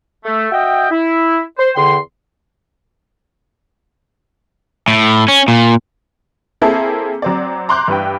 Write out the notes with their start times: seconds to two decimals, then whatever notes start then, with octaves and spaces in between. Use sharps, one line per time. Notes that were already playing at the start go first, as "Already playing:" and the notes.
0.25 A3
0.52 F#4 D#5 E5 G5
0.91 E4
1.59 C5
1.76 E2 D3 G5 C6
4.88 A2
5.28 C#4
5.48 A#2
6.61 A#3 C4 E4 G#4 A4 A5
7.22 F#3 C4 D5
7.69 A#5 C6 D6 F#6 G6
7.88 G2 E3 B4 G5